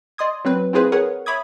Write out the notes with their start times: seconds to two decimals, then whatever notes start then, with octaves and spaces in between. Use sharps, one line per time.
0.18 D5 D#5 C6 D#6 G#6
0.45 F#3 C4 B4
0.73 C4 E4 F4 G#4 B4 C5
0.92 G#4 A#4 B4 C#5 F#5
1.26 C#5 E5 B5 D6 D#6 G#6